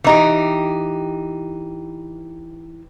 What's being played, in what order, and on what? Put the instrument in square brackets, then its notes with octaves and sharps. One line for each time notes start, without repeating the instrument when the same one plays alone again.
[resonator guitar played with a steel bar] E3 D#4 G4